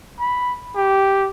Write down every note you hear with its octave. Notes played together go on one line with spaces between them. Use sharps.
B5
G4